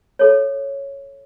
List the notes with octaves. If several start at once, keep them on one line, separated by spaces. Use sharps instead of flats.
A4 C#5